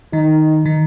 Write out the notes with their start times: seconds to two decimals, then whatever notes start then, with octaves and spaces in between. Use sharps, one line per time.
0.13 D#3 D#4
0.66 D#3